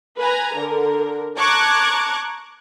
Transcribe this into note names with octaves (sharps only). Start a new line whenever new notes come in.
B4 G#5 A#5
D3 A#4
A5 A#5 C#6 D6 F#6 G#6